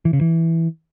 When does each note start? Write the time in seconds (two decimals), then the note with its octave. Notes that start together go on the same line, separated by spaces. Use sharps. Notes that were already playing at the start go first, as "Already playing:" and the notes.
0.05 E3
0.13 C#3
0.21 E3